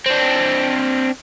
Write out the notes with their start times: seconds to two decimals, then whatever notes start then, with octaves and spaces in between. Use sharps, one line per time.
0.06 C4 D4